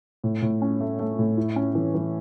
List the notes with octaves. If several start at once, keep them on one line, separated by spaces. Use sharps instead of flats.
A2
A2
C#4
A3
A3
A2
E4
C#4
E3
E3